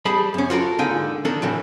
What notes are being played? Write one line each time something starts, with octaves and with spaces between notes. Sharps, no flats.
G3 G#4 A5 B5
F#2 C#4
F4 F#4 A4 A#4
G#2 D3 A#3 D#4 G5 G#5
D#3 A#3 D4 A4
A2 E3 F#3